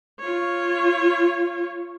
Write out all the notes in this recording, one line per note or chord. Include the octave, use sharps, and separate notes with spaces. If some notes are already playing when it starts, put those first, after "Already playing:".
F4 C#5